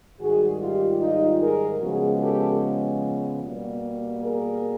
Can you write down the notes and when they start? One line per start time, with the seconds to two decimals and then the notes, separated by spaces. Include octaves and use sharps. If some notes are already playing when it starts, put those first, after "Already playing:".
0.20 G#2 D#3 G3 F#4 G#4
0.60 F4 G4
1.01 D#4 F4
1.41 G#4 A#4
1.81 C#3 F3 G#3 B3 F#4 G#4
2.21 G4 A4
3.42 B2 G3 A#3
4.22 G#4 A#4